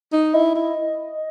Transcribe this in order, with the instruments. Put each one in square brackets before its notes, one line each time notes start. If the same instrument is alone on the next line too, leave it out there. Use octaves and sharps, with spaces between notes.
[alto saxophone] D#4
[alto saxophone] E4 [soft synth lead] D#5
[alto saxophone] E4